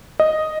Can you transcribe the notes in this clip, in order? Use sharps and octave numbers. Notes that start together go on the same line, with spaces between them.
D#5